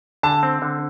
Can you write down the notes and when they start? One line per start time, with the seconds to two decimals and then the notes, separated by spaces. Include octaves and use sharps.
0.23 D3 A5
0.43 C4
0.62 D3